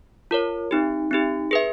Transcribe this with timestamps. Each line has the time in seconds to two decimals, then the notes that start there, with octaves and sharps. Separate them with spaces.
0.31 F4 A#4 C#5
0.71 C4 D#4 G4
1.11 C4 D#4 G4
1.51 G#4 B4 E5